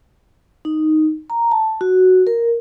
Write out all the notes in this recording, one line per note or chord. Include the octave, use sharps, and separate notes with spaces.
D#4
A#5
A5
F#4
A#4